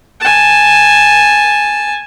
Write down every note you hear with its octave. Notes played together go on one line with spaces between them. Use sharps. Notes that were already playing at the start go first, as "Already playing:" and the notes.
G#5 A5